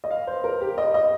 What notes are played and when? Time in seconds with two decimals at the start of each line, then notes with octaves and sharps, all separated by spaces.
0.04 D#5
0.10 F5
0.27 C5
0.44 A#4
0.61 G4
0.78 D#5
0.94 D#5